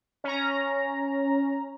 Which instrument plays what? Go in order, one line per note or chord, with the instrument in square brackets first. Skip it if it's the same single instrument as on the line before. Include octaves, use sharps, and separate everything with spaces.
[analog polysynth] C#4 A#5